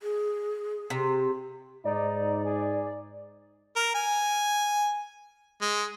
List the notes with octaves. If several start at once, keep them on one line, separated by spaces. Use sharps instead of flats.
G#4
C3
G#2 D#4 D5
G#4
A#4
G#5
G#3